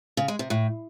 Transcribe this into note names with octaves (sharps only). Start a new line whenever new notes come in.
C#3
G#3
C3
A2